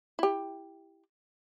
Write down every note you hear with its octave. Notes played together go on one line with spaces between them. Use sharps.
E4 G4